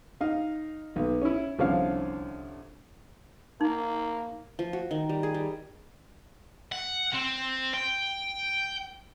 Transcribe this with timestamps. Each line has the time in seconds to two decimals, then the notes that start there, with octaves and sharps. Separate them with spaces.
0.21 D#4 F5
0.96 B1
1.22 C#4 E4
1.59 C2 D3 F3 C#4 F5
3.61 A#3 D#4
4.59 F3
4.73 F#4
4.91 D#3
5.09 G3
5.23 G#4
5.34 G3
6.72 F#5
7.14 C4
7.74 G5